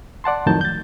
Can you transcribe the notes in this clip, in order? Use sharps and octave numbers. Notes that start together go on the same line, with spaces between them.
D5 F#5 A5 C6
F2 A2 D#3 F#3 A5 G6
G6 A6